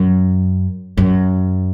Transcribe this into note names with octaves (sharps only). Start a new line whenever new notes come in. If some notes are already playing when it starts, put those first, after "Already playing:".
Already playing: F#2
F#2